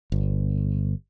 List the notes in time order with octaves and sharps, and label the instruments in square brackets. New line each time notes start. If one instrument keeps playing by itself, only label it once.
[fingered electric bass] G1